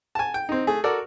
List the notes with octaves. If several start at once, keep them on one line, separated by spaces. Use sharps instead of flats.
G#5 A5
G5
C4 D#4
A3 G#4
F#4 A4 A#4 D5